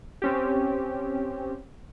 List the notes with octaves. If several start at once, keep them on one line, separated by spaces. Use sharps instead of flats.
C4 C#4 G4